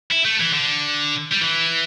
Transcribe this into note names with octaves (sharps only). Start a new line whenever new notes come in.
E4
A3
E3
D3
G3
E3